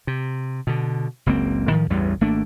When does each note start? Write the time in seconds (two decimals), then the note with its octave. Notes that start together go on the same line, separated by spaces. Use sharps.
0.07 C3
0.67 B2 D3
1.26 F#1 C#2 A#3 C4
1.70 A2 D#3 F3
1.90 A1 E2 G2 G3
2.21 G#1 A3 A#3 D4